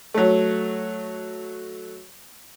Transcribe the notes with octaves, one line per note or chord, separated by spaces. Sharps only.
F#3 A3